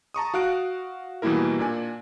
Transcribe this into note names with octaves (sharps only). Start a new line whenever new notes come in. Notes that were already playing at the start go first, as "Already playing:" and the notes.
A5 A#5 C#6 D#6
F#4 F5 F#6 D7
B2 E3 G3 A#3 E4 A#4
A#2 D4 G#5